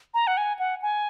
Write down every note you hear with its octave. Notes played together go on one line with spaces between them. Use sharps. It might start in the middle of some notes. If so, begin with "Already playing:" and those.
A#5
F#5
G#5
F#5
G#5